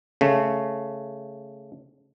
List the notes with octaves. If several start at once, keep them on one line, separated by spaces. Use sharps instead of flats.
C#3 A3